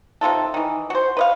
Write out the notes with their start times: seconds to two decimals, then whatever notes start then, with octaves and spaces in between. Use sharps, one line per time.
0.21 C3 D#3 F4 A4
0.54 D#3 E3
0.90 F#4 C5
1.17 B4 D#5 F5